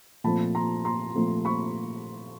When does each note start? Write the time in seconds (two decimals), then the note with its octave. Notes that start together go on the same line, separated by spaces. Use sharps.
0.24 A#2 F3 A3 C4 A5 B5
0.55 A#5 C6
0.85 A#5 C6
1.15 A#2 F3 A3 C4
1.45 B5 C#6